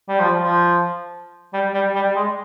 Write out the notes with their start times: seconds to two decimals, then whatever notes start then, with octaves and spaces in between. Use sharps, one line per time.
0.08 G3
0.20 F3
0.43 F3
1.53 G3
1.74 G3
1.95 G3
2.16 G#3